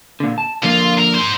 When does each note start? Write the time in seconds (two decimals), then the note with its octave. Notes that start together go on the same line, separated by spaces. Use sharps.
0.20 A#2 D3
0.38 A5
0.63 D3 F3 A#3 F4
0.98 A#4
1.15 D#4 C5